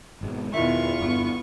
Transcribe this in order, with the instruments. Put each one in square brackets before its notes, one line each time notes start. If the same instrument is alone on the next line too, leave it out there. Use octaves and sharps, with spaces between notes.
[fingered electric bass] G#1 G#2 B2
[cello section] E2 B2 [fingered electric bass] D#3 [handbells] E4 E5 [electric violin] F4 C#6
[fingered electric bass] G1 G2 [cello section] B3